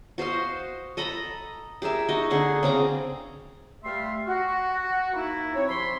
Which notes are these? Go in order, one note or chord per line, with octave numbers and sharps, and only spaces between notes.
F#4 C5 D#5 F5
A4 D#5 A#5 B5
G4 G#4 A#4 E5
D#4 F#4 D#5
D3 G#4 F#5 G#5
C#3 C4 A#5 D6
G3 A3 E5 F5 C6
F#4
A#3 D#4 E4
C4 C#5
C3 F3 B5 C6